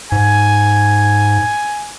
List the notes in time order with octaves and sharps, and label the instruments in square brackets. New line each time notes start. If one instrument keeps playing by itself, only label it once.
[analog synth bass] G#2 [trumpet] G#5